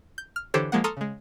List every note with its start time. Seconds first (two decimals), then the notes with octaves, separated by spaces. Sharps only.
0.18 G6
0.36 F6
0.54 D3 E3 G4 A4 C5 C#5
0.72 F3 G#3 A#3 F#5
0.84 A4 A#5 C6 C#6 D#6 F6
0.97 C#3 G#3